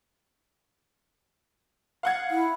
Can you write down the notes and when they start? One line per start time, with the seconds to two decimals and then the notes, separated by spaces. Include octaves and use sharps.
2.03 F5 F#5 G#6
2.31 E4